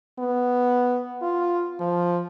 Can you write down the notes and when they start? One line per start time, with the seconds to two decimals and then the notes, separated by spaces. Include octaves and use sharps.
0.18 B3
1.22 F4
1.80 F3